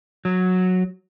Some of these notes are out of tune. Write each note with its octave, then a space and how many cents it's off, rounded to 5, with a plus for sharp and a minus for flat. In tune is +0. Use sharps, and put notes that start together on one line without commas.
F#3 -10